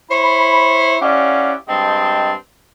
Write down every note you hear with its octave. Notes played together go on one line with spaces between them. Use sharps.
E4 C5 C#5 B5
C#4 E4 G4 D5 F5 F#5
G2 G#3 C4 D#5 G5 A5